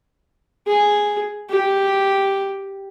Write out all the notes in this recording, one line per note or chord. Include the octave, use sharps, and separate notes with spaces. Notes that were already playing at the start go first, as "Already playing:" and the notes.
G#4
G4